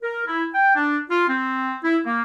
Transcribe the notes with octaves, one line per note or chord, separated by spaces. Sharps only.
A#4
E4
G5
D4
F4
C4
E4
A#3